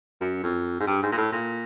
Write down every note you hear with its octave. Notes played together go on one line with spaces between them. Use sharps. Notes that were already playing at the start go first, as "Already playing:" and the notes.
F#2
F2
G#2
G2
G#2
A#2
A2
A#2